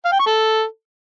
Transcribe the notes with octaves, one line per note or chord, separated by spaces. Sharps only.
F5
G5
C#6
A4